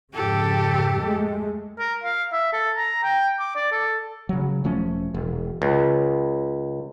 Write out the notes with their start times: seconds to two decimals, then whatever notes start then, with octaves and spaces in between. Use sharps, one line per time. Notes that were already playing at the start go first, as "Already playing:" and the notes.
0.15 F2 G#2 C#3 G4 A4
1.00 G#3 A3
1.79 A#4
2.04 F5
2.32 E5
2.53 A4
2.77 A#5
3.04 G5
3.39 D6
3.56 D5
3.72 A4
4.29 C#3 F#3
4.64 E1 F3 A3 C#4
5.14 E1
5.62 C#2